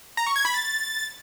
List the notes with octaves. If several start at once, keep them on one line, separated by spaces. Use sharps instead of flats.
A#5
C#6
G#6
B5
A6